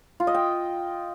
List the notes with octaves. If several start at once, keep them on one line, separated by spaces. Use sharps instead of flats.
F4
D#5
G5